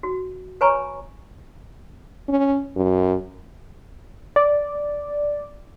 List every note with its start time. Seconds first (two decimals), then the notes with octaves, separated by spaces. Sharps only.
0.03 F#4
0.61 B4 C#5 G#5 A#5 B5 C#6
2.29 C#4
2.76 F#2
4.36 D5